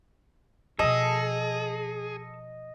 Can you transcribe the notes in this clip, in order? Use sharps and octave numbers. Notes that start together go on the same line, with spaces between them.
B2 F3 G#4 A4 D#5